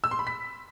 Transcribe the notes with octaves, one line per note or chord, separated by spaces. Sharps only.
E6
C6
B5
B6